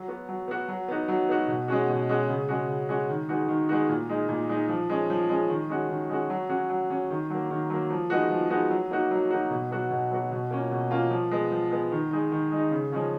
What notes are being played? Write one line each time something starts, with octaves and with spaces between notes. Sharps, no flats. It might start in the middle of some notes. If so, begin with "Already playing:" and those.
Already playing: F#3
B3 F#4
F#3
B3 F#4
F#3
B3 D#4 F#4
F#3
B3 D#4 F#4
B2
G#3 C#4 F#4
B2
G#3 C#4 F#4
C#3
G#3 C#4 F#4
C#3
G#3 C#4 F#4
D#3
G#3 B3 D#4 F#4
D#3
G#3 B3 D#4 F#4
A#2
G#3 D#4
A#2
G#3 D#4
F3
G#3 C#4
F3
G#3 C#4
D#3
G#3 C#4 F#4
D#3
G#3 C#4 F#4
F#3
C#4 F#4
F#3
C#4 F#4
D#3
F#3 A#3
D#3
F#3 A#3
F3
G#3 B3 D#4 F#4
F3
G#3 B3 D#4 F#4
F#3
A#3 D#4 F#4
F#3
A#3 D#4 F#4
B2
F#3 B3 F#4
B2
F#3 B3 F#4
B2
A#3 C#4 F4
B2
A#3 C#4 F4
F3
G#3 B3
F3
G#3 B3
D#3
G#3 D#4
D#3
G#3 D#4
C#3
F3 G#3 C#4 F4